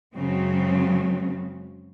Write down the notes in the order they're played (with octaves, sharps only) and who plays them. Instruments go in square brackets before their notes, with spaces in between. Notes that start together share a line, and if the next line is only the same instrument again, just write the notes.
[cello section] F#2 C#3 F#3 G#3 C4